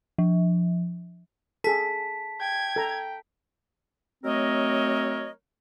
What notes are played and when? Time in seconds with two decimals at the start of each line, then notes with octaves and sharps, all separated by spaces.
0.18 F3
1.64 G#4 A4 A5 B6
2.41 G5 G#6
2.76 A4 A#5
4.24 F#3 A3 C4 A#4 C#5 D#5